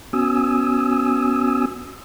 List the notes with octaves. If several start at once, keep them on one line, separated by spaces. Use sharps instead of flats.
B3 C#4 F#4 G#5 D#6 E6